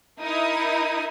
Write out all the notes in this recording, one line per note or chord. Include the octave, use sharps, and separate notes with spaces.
D#4 E4 A#4 D#6